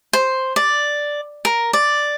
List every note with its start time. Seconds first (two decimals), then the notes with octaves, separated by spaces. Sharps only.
0.13 C5
0.56 D5
1.45 A#4
1.73 D5